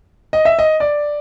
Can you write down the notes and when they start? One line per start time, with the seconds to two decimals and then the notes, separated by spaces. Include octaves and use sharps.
0.33 D#5
0.45 E5
0.59 D#5
0.80 D5